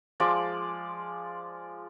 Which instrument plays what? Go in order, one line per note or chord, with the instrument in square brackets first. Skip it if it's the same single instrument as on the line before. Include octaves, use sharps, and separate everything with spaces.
[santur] F3 G#3 D5 D6